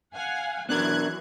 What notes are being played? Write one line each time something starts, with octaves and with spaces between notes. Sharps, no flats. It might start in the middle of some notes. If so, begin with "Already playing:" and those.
F5 F#5 G#5
F#2 E3 B3 D4 A#4 F#6 G#6